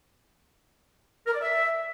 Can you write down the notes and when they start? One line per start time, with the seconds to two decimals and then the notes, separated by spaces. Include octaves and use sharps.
1.26 A#4
1.34 D5
1.42 E5